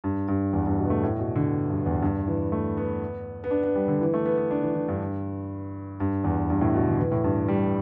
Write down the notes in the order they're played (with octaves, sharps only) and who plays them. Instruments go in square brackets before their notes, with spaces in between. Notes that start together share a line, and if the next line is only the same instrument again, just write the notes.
[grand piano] G2
G2
E2
G2
B2
B3
A3
A2
B2
D3
G2
E2
G2
E3
A3
B3
B3
D4
B3
G3
D3
E3
A3
B3
B3
D4
E3
E3
G2
G2
E2
G2
A2
B2
D3
E3
A2
G2
G3